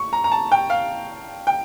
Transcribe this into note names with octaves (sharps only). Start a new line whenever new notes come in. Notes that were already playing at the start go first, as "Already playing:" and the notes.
Already playing: A3 C#6
A#5
A#5
A5
G5
F5
G5